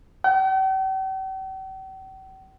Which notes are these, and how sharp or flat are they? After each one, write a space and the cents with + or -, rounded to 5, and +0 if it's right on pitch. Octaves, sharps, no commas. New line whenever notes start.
G5 -45